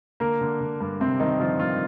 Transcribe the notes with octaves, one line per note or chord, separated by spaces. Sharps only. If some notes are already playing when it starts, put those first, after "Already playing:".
D3 A#3 A#4
D3
D3
G2
G2 C3 C4
G2 D#3 D#4
D3 F3 F4
G2 F3 F4